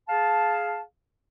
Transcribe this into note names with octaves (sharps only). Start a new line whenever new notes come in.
G#4 F5 A5